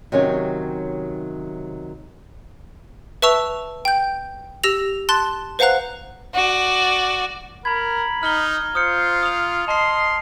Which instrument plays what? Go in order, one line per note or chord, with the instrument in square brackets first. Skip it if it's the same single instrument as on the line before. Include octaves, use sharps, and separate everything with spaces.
[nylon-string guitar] C3 D#3 F#3 C#4 G4 C#5
[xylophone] B4 E5 A5 C#6 E6 F7
G5 G6
G4 E6 A#6 F7
A5 C6 F#6 A6 E7 G7
B4 C5 F5 F#5 A#5 F#6
[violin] F#4 D5
[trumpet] A#4 [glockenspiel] A#5 G#6 [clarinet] B5
[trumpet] D#4 [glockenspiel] F6 G7
[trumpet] F4 [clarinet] C5 [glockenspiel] D#6 F6 C#7
[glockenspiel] D#6 F7
[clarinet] D#5 [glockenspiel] A5 C7 [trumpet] C6